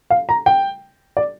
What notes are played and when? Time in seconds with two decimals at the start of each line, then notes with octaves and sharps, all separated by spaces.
0.10 F5
0.29 A#5
0.46 G5
1.17 D5